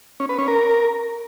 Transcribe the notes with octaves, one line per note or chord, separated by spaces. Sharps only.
C#4
B4
C#4
A#4